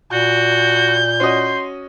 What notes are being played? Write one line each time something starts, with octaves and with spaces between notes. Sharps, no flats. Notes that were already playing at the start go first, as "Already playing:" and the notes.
A#2 F#4 G6
C#4 F#4 D#5 C6